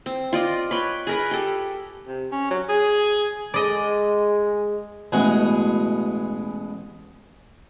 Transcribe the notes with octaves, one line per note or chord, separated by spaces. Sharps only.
C4
F4 D5 D#5
B4 C#5 G5
G#4 A#4 B4
G4 A4
C3
C#4
F#3
G#4
G#3 D5 D#5
A1 B2 G#3 F#4